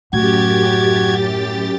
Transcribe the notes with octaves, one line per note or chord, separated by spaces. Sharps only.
F#2 A2 F#4 G4 G#6 A6